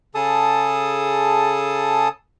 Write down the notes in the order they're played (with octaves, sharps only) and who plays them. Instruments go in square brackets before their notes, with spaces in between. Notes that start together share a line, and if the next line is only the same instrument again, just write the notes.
[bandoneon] C#3 G#4 A4 A5 D#6